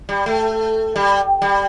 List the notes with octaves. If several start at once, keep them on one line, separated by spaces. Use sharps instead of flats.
G3
A3
G3
G3